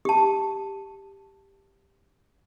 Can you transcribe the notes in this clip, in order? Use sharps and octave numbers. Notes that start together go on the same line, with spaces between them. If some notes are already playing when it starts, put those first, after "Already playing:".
G4 A5